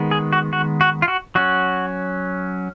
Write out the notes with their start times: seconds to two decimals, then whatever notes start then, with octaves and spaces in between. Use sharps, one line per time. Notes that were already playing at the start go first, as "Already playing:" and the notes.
Already playing: D#3 G#3 B3
0.11 G#4
0.33 F#4
0.53 F#4
0.81 F#4
1.02 F4
1.08 F#4
1.35 F#3 C#4 F#4